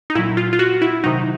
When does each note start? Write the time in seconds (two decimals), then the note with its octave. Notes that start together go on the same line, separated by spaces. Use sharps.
0.10 D#4
0.15 A#2 F#3 E4
0.37 F4
0.53 F4
0.59 F#4
0.82 E4
1.04 C3 D#3 F#3 D#4